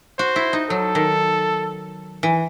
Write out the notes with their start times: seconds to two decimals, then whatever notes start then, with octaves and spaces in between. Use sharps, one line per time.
0.18 F#4 C5
0.36 E4
0.53 D#4
0.69 F#3 A4
0.95 D#3
2.23 E3